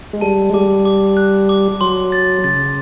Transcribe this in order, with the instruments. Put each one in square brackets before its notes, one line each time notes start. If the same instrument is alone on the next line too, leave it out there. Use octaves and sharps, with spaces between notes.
[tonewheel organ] G#3
[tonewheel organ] G3 [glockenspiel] A5
[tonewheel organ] G#3
[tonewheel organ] G3 [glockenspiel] D6
[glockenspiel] D6
F#6
D6
[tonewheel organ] F#3 [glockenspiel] C6
[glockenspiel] A6
[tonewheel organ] C#3 [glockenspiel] A6